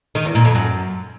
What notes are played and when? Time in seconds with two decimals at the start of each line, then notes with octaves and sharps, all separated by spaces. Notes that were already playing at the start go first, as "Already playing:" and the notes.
0.15 D#3
0.25 E2
0.35 A#2
0.45 F2
0.55 F#2